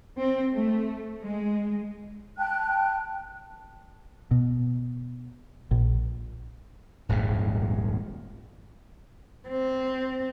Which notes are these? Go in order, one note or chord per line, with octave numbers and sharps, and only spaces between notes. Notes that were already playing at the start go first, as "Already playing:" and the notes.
C4
A3
G#3
G5 A5 F#6
B2
A#1
D#1 G#1 F2 G#2
C4